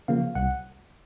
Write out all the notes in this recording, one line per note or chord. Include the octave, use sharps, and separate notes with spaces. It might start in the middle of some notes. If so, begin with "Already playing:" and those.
C#3 F3 A#3 F5
C2 F#5